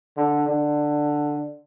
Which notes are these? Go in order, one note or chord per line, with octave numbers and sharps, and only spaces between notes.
D3
D3